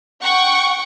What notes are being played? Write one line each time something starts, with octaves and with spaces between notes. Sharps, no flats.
F#5 G5 C#6